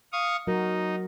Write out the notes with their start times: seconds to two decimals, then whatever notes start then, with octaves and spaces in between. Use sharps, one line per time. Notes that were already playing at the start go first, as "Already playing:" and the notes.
0.13 F5 C#6 D#6
0.47 F#3 D#4 F#4 A#4